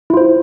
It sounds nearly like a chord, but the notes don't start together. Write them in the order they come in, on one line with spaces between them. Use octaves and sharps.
E4 F4 C5